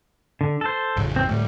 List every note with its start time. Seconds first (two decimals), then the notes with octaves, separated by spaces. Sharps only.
0.41 D3
0.61 A4 C5
0.96 A1 F2 C#3
1.16 C4
1.29 D2 A2 G3 A3